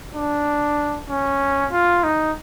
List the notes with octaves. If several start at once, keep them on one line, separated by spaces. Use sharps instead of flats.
D4
C#4
F4
D#4